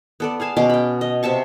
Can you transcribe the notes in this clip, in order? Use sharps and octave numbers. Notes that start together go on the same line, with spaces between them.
B3 A4 D5
G#4 F5 G#5 A5
B2 C#4 C6 D6
G5 B5
D#5
C3 E5 A5 C#6